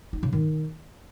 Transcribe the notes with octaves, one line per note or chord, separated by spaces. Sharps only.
D#4
C#3
D#3